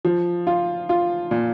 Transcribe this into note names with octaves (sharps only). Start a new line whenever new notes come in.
F3
F4
F4
A#2